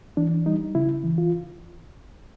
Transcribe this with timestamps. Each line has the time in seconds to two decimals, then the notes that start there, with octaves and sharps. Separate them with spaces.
0.17 E3 D4
0.46 G3 D#4
0.75 C#3 E4
1.04 E3
1.18 F4